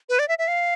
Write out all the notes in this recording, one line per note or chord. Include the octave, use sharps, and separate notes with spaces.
B4
D5
E5
E5
F5